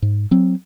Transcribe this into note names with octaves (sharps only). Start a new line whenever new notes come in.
G#2
F#3 C4